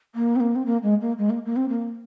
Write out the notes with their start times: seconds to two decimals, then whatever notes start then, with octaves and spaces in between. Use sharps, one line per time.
0.15 A#3
0.36 C4
0.40 A#3
0.55 C4
0.66 A#3
0.83 G#3
1.00 A#3
1.18 G#3
1.30 A#3
1.45 A#3
1.56 C4
1.69 A#3